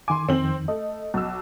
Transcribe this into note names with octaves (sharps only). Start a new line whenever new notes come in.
D#3 G#5 C6 D6
F2 D#3 C4 F#7
A3 D#5
B1 E6